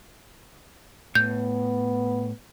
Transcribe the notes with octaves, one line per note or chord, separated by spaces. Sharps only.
A2 B3 G6